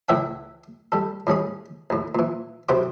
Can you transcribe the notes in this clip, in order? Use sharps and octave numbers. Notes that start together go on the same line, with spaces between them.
C#2 A2 E3 E5 F#5 G5
G3 A4
A2 G3 C#4 G#4
D#2 A2
A#2 E3
B1 F#2 C3 B3 C5 D6